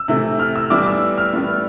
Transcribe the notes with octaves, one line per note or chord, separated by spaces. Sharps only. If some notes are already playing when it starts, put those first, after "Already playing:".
Already playing: E6
C3 E3 A3
F6
E6
A2 E3 G3 B3 D6
E6
F6
A2 G3 B3